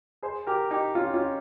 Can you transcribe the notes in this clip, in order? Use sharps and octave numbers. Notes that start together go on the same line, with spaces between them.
G#4 C5
G4 A#4
D#4 G4
C#4 F4
C#4 F4